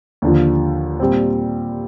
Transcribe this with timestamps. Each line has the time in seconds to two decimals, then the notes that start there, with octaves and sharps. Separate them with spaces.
0.22 D#2 D3 F3
1.00 A#2 G3 C4